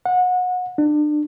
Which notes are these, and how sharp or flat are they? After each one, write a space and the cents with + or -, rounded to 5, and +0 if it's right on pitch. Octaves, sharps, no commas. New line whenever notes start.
F#5 -25
D4 +30